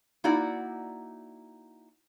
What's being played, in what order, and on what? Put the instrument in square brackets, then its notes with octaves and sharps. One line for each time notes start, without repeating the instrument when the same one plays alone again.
[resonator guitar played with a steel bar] A#3 D#4 E4 F#4 D5 F#5